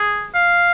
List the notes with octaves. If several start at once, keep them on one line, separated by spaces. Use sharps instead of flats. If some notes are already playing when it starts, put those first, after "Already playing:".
Already playing: G#4
F5